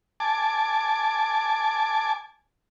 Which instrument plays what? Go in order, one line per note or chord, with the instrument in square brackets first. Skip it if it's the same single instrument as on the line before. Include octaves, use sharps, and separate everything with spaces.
[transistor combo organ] G#5 A5 D6